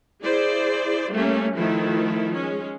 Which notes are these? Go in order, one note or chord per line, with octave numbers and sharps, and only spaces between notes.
E4 G#4 C5 D5
G3 A3 A#3 C#4
D#3 F3 A3 E4
G#3 C#4